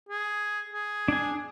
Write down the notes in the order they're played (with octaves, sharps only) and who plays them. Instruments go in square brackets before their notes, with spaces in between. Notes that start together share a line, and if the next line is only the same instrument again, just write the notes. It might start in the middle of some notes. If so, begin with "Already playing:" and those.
[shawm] G#4
G#4
[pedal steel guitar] D4 G#5